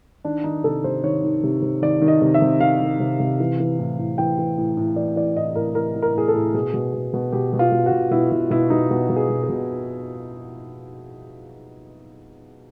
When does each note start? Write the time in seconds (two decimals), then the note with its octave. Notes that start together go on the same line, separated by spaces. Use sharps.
0.25 D#3 D4
0.44 D#3 D#4
0.64 C3 A4
0.84 C3 C5
1.04 D#3 C#5
1.24 D#3
1.43 C3
1.62 C3
1.82 D#3 D5
2.01 D#3
2.08 D#5
2.22 C3
2.34 E5
2.42 C3
2.61 D#3 F5
2.81 D#3
3.00 C3
3.20 C3
3.40 E3
3.60 E3
3.79 A2
3.99 A2
4.18 E3 G5
4.39 E3
4.58 A2
4.77 A2
4.96 E3 D5
5.16 E3 D5
5.36 A2 D#5
5.55 A2 A#4
5.75 E3 A#4
5.96 E3
6.02 A#4
6.15 A2 G#4
6.28 A4
6.35 A2
6.54 B2 G#4
6.74 B2
6.94 B2
7.14 B2
7.32 B2 G4
7.53 B2
7.59 F4
7.72 B2
7.86 F#4
7.92 B2
8.11 B2 E4
8.31 B2 E4
8.51 B2 E4
8.70 B2 D#4
8.91 B2
9.10 B2
9.16 G#4
9.30 B2
9.43 G#4
9.49 B2